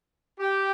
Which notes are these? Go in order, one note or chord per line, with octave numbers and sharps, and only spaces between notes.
G4